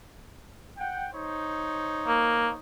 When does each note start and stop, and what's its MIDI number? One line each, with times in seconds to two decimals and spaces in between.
0.77 1.07 78
0.77 1.07 79
1.13 2.57 63
1.13 2.57 72
1.13 2.57 73
2.07 2.50 58